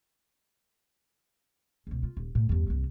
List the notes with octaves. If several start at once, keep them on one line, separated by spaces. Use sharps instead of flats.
C#2 B2
F4
D#1
A2
E2 G2
C2 A#3